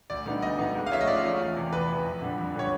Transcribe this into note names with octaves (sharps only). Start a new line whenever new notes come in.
D2 D5
D3 G3 B3 D#4
D2 D#5
D3 G3 B3 D#4
G#2
F5
F3 A3 C#4 E5
D#5
G#2 D5
F3 A3 C#4
E2
C3 E3
E2 B4
C3 E3
F2
D3 G3
F2
D3 G3 C#5